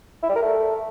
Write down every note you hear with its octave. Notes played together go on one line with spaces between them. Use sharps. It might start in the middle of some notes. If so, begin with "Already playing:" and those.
E4
G3
A#4
A3